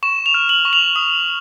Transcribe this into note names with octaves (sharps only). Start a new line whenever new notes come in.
C#6 E7
F7
F6
F#7
C#6
F7
D#6